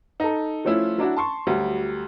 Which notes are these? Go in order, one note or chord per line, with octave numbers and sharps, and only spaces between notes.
D#4 A4
F3 A3 C#4 E4 F4
F#3 D4 E4 F#4
A5 C6 C#6
D2 F#3 G3